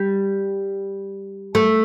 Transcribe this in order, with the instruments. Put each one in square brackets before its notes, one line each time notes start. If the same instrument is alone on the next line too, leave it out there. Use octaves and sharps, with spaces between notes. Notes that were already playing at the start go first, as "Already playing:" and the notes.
Already playing: [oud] G3
A3